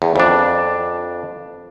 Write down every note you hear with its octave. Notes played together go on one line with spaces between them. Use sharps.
E2
F2 D4